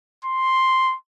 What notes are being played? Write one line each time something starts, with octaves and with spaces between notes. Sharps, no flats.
C6